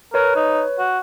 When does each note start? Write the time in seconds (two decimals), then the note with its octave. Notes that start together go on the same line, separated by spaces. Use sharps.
0.14 A#4 B4 C#5
0.36 D#4
0.79 F#4